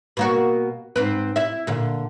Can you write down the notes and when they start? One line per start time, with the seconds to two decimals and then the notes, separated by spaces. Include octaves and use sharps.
0.17 B2 A#3 F#4
0.96 G#2 C4 B4
1.36 E4 E5
1.67 A#2 D3